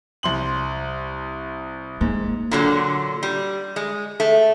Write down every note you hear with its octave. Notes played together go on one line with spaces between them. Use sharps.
C2 C6 F#7
G#2 A#3
A#2 D3 F#3
G3
G#3
A3